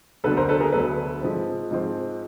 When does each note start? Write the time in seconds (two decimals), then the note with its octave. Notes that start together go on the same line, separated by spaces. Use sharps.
0.24 D2 D3 F#3 B3 A4 B4
0.37 A#4 C5
0.49 A4 B4
0.60 G#4 A#4
0.73 D2 D3 F#3 B3 A4 B4
1.21 G#2 F3 G#3 C4
1.71 G#2 F3 G#3 C4